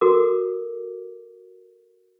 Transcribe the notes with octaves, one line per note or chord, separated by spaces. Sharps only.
F#4 A4 A#4 D6